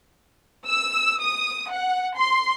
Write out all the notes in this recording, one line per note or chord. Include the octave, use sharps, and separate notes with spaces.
E6
D#6
F#5
C6